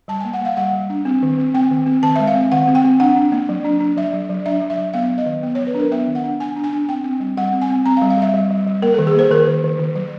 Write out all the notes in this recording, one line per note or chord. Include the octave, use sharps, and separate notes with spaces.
G3 A5
G#5
A#3
F#5
A#3 F5
G3 F#5
G3
D4
C4
D#3
C4
C4 G5
D#3
C4
D#3 A5
E5
G#3
F5
C4
D#3 F#5
C4
G5
C4
D4 F#5
D4
A#3
F#3
D4
D4
F#3 E5
F#3
F#3
D4 E5
F#3
E5
F#3
B3 F5
F#3
D#5
D#3
B3
C#5
F#3
B4
D4 A#4
B3 E5
D#3
F#5
D4
D4 G#5
D4
G#5
D4
C4 G5
C4
G3
G3 F#5
C4
G#5
C4
C4 A#5
F5
G3
F5
G3 E5
G3
G3
G3
A#3 A#4
A4
D#3
G#4
A#3 C5
D#3 A#4
D#3
D#3
D#3
F#3